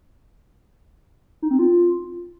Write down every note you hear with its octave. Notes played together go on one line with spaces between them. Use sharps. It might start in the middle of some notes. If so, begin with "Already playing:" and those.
D#4
C4
F4